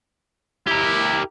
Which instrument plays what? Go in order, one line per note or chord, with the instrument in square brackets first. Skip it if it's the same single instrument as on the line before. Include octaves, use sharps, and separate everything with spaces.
[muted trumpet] E4 [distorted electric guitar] G4 A#4